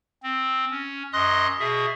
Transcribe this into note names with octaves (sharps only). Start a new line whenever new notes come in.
C4
C#4
F#2 D#5 C6 D#6 F#6
B2 G#4 E5